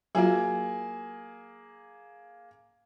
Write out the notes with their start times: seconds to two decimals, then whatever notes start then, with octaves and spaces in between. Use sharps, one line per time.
0.15 F#3 A#3 F4 F#4 G#4